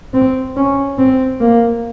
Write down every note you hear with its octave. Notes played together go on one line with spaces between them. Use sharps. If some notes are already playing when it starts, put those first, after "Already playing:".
C4
C#4
C4
A#3